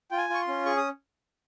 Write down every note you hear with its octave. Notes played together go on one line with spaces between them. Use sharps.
F4 G5
G#5
F4 C#6
C6
C#4
G#4 C#6
D#6